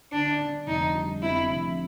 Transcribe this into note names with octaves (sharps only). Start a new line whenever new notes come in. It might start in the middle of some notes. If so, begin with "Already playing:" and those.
D3 D4
D3
F1 D#4
G3
F2 E4
F1